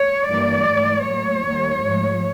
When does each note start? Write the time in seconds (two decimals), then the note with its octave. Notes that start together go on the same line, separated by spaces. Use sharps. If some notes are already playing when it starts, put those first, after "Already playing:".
Already playing: C#5
0.27 G2 E3 G3 A#3 D5
0.66 G#2 E3 A3
1.05 A2 F#3 A#3 C#5
1.44 D#2 D#3 G3 A#3
1.83 G#2 F3 A3